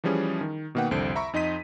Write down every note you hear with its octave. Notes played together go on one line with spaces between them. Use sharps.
E3 F3 G3 C#4 G#4
D#3
B2 D#3 A#3 B4 F#5 G5
C2 F2 D3 C5 D7
E5 A#5 B5 C#6
F2 D#4 D#5 C6 B6 D#7